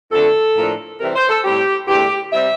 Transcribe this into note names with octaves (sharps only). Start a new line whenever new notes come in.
F2 D3 A3 A4
A2 F3 A#3 D4
C3 E3 G3 C4 A#4
C5
A4
A2 G3 C4 G4
E2 D3 A3 D4 G4
C3 G3 C4 E5